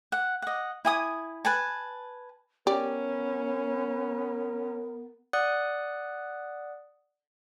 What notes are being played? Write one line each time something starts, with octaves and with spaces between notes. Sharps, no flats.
F#5
D#5 F#5
E4 G#5 D#6
B4 G#5 A5
B3 C#4 G4 A#4 D5
D5 F#5 D#6 F#6